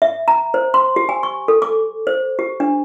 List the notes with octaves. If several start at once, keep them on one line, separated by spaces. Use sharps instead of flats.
E5
A#5
C5
C6
G4
G#5
C#6
A4
D6
C5
G4
D4